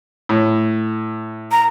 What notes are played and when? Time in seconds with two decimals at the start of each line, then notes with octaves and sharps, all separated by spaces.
0.29 A2
1.52 A#5